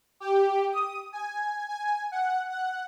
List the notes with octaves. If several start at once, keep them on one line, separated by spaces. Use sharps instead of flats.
G4
D#6
G#5
G#5
F#5
F#5